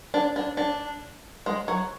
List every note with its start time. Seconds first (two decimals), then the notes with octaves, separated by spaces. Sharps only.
0.14 D4
0.36 D4
0.57 D4
1.46 G#3
1.68 F#3